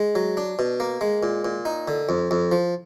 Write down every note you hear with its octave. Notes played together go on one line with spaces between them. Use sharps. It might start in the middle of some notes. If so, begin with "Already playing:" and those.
Already playing: G#3
F#3
D4
B2
A#3
G#3
A#2
A#2
D#4
D3
F2
F2
F3